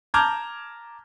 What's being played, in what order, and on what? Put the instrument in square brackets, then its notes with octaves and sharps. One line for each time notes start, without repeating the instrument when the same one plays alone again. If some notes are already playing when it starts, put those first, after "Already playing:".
[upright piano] A5 A#5 D6 F6 G6 G#6